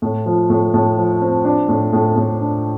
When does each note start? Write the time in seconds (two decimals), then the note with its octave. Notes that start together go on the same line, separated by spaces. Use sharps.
0.02 A2
0.26 F3
0.50 A2
0.74 A2
0.97 F3
1.22 C4
1.45 D4
1.68 A2
1.93 A2
2.16 A2
2.41 D4